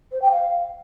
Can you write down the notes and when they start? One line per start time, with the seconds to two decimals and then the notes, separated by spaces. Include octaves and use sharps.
0.12 C5
0.22 G5
0.32 F5